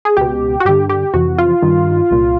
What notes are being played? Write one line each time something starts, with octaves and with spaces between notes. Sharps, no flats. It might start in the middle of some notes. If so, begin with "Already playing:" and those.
G#4
C#2 B2 G4
F#4
G2 D3 G4
G4
F2 C3 E3 F#4
F4
G2 D#3
C2 A#2